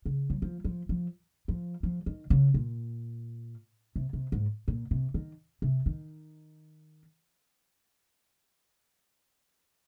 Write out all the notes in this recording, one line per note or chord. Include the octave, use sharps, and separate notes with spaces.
C#3
F#3
F3
F3
F3
F3
F3
D#3
C#3
A#2
C3
C3
G#2
A#2
C3
D#3
C3
D#3